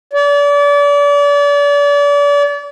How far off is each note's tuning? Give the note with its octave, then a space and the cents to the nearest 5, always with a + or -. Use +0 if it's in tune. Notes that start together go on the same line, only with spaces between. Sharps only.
D5 -35